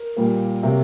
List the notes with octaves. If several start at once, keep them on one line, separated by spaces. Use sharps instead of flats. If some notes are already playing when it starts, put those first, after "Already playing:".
Already playing: A#4
A#2 G3 A#3
C3 F#3 A#3